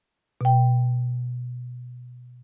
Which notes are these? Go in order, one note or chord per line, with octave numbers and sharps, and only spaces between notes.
B2 G5